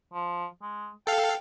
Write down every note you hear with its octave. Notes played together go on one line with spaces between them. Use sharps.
F3
G#3
A4 F5 G5